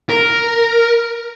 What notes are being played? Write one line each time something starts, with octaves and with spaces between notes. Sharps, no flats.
A#4